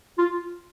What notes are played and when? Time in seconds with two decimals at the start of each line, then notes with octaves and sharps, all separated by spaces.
0.18 F4